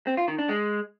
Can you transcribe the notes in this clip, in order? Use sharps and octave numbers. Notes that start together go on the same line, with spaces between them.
C4
F4
D#3
D4
G#3